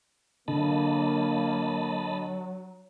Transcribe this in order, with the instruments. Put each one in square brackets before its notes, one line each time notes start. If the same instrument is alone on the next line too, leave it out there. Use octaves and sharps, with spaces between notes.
[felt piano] D3 [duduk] F#3 [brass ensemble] A#3 [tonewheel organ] D#5 A5 B5